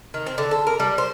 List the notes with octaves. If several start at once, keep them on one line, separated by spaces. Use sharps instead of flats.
D#3
C4
D3
A4
A#4
G3
C5